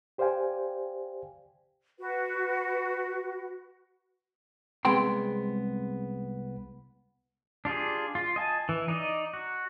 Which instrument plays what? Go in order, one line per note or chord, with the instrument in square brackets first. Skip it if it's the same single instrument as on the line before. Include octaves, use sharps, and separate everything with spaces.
[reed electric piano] G4 C5 D5 F5 G5 G#5
[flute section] F#4 B4
[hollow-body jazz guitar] C2 G#3 B3 C4 G5 C6
[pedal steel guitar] D4 F4 G4 G#4
F4
D#5 G#5 A5
E3
D#4 D5 D#5
F#4